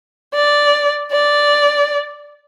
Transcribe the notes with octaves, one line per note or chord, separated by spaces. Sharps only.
D5
D5